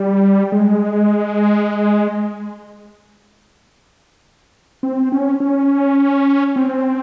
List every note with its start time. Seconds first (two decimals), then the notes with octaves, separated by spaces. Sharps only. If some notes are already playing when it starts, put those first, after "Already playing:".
Already playing: G3
0.52 G#3
4.83 C4
5.12 C#4
5.40 C#4
6.56 C4